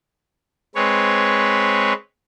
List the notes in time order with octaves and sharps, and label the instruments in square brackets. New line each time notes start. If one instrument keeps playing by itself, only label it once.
[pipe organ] G#3 C4 B4 C#5